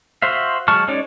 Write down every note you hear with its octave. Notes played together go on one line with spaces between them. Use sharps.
F#4 C5 E5 F5
F#3 G#3 A5 C#6 F6
G#3 C#4 D#4 C#5 D5